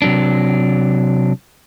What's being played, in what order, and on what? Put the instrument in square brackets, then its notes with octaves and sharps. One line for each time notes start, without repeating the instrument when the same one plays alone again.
[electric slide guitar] C3 F#3 D4